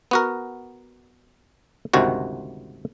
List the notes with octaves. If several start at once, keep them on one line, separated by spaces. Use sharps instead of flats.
B3 F#4 A#4
G1 C#2 C3 D#3 F#4